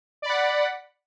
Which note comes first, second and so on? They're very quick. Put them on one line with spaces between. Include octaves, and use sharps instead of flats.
D5 B5 F#5